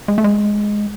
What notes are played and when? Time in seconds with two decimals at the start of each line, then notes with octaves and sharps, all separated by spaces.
0.08 G#3
0.18 A3
0.24 G#3